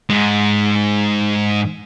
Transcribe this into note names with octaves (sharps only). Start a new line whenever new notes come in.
G#2 G#3